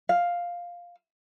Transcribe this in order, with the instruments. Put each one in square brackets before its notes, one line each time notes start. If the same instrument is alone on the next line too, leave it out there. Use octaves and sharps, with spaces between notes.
[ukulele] F5